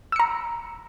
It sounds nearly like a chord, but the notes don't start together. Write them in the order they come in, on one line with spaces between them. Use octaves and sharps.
E6 C#7 A#5